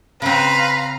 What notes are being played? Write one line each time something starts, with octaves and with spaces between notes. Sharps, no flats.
C#3 C4 B4 F5 A#5